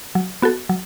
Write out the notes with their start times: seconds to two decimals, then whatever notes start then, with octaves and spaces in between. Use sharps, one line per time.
0.15 F#3
0.42 B3 F#4 A4
0.69 F#3